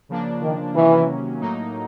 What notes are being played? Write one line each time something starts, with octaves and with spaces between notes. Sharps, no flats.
C#3 F3 A#3 D4
D#3
C3 D#3 E3 F#3 A#3 C#4
A2 F#3 A#3 D#4